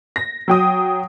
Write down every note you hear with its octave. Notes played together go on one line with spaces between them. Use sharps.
A#6
F#3 G5 D#6